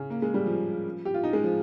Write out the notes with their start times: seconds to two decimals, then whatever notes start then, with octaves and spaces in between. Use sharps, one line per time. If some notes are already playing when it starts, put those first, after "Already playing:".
Already playing: C#3
0.10 A#3
0.22 G#3
0.34 G3
0.46 F3
1.05 G4
1.14 F4
1.24 D#4
1.33 G#3
1.44 F3